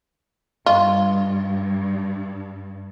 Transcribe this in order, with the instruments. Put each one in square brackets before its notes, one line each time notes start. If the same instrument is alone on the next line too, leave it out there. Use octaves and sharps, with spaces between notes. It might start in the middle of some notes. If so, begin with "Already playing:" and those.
[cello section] G2 [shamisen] F4